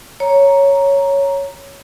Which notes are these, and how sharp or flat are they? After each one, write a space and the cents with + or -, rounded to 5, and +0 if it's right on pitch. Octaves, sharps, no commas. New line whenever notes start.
C#5 +0 A#5 +0